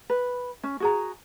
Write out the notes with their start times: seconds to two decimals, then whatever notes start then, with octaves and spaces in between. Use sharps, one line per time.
0.10 B4
0.63 C#4
0.80 F#4 G#4 A#5